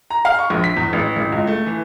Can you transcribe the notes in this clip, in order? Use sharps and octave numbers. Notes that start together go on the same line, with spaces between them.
A#5
F5
C#6
A#1
B6
E2
A1
A1
C#2
A3
E3